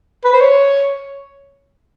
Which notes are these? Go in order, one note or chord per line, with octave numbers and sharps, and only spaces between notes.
B4
C5
C#5